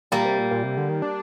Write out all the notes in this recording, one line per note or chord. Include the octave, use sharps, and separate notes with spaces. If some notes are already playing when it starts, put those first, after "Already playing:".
A#2 G3 A#3
C3
A#2
A#2
C3
D3
D#3
D4